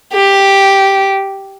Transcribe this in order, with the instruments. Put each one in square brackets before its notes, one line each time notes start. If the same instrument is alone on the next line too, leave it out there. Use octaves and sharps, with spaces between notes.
[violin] G4